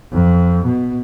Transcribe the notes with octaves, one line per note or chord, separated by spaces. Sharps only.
F2
B2